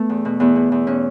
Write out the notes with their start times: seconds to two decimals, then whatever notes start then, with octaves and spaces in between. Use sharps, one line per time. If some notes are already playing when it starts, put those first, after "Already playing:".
Already playing: A3 B3
0.09 E2
0.25 B2
0.40 E2 B3
0.56 B2
0.72 E2
0.87 B2 C#4